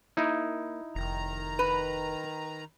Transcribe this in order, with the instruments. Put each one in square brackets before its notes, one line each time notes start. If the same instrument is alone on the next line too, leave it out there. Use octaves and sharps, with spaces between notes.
[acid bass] A#3 [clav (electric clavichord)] D#4 E4
[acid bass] F1 [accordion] D#3 A#5
[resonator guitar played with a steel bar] B4